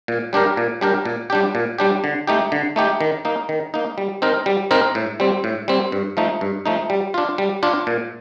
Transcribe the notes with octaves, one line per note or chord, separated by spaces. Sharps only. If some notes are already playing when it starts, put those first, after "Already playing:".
A#2
G3 D4 G4 A#4
A#2
G3 D4 G4 A#4
A#2
G3 D4 G4
A#2
G3 D4 G4
D3
A3 D#4 G4
D3
A3 D#4 G4
D#3
A#3 D#4
D#3
A#3 D#4
G3
C4 D#4 A#4
G3
C4 D#4 A#4
A2
G3 C4
A2
G3 C4
G2
F3 A3 D#4
G2
F3 A3 D#4
G3
D4 F4
G3
D4 F4
A#2